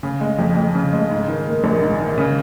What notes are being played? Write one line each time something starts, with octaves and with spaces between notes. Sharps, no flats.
C#3
G#3
F2
F2
C#3
G#3
G#2
D#3
A#3
A#1
G#2
D#3
C#3